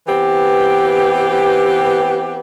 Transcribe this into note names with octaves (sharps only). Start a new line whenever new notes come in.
E3 B3 C4 G4